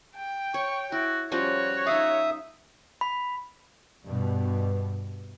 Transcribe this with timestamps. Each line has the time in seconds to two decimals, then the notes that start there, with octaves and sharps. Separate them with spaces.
0.17 G5
0.54 C#5 C#6
0.92 E4 F#4
1.32 F3 G3 C#4 F#4 C#5
1.87 D#4 E5 F5 D#6
3.01 B5
4.05 G2 B2